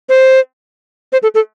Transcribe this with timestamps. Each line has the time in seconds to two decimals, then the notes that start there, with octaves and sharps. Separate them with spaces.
0.09 C5
1.12 C5
1.23 A4
1.35 A4